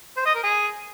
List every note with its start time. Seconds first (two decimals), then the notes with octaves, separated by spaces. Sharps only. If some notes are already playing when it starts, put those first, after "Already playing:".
0.17 C5
0.26 D#5
0.35 A#4
0.44 G#4